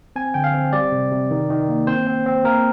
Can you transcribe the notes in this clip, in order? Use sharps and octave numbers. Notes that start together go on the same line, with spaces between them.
C4 G#5
D3 G5
F5
C4
G3 D5
C3
C3
D#3
D#3
A#3
C4 C5
C4
C4
A#3 A#4